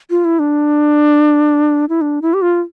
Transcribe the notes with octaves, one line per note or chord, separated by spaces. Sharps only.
F4
E4
D4
E4
D4
E4
G4
F4